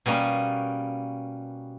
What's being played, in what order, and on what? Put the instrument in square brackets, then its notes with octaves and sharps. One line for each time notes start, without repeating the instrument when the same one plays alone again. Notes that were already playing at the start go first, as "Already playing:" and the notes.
[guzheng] B2 G3 A#3 C#4